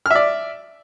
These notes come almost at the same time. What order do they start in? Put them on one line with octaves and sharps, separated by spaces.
F6 E5 D5